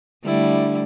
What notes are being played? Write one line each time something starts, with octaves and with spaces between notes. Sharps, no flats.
D3 G3 A3 E4